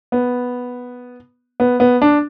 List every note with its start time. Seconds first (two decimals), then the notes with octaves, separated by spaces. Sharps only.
0.12 B3
1.60 B3
1.80 B3
2.02 D4